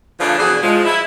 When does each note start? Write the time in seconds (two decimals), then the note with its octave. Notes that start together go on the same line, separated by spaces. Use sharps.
0.19 C#3 E3 F3 A3 D4
0.39 B2 E3 F#3 D4 E4 G#4
0.62 F3 G#3
0.85 E4